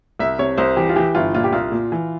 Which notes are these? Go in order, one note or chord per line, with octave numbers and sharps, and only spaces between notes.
C2 E5
C3 C#5
C2 C5
E3 G4
F4
E3 G4
G1 F4
A#2 F4
G4
C2 F4
A#2
E3